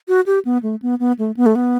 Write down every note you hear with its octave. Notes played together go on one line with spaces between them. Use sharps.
F#4
G4
B3
A3
B3
B3
A3
B3
A3
B3